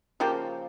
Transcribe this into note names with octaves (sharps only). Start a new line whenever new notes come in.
C#3 F3 A#3 G4